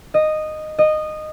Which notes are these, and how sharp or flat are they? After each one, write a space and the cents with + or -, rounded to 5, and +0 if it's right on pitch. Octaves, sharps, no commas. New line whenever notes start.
D#5 -10
D#5 -15